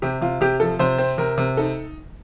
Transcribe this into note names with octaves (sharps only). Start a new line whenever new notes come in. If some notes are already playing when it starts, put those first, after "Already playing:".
C3 G4
C3 F4
C3 G4
F3 A4
C3 C5
C4
C3 A#4
C3
D#4 A4